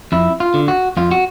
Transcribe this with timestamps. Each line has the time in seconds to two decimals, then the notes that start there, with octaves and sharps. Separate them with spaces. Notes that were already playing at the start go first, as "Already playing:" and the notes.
0.12 F2 E4
0.40 F4
0.54 D3
0.68 F#4
0.97 F2 F4
1.11 F#4